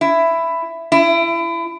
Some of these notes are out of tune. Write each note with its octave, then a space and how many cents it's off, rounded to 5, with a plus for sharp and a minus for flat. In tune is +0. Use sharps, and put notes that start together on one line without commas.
E4 +10
E4 +30